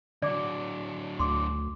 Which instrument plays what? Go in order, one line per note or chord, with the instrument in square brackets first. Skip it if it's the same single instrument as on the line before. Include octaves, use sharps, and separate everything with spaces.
[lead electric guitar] D3 F#3 [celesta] D5 D6
[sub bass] D2 [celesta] C6 D6